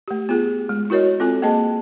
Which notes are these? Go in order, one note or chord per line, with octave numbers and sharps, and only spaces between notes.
A3 G4
B3 F4 G#4
G#3
E4 F#4 A#4 C#5 D#5
C4 F4 A4 G#5
A#3 G#4 D#5 A5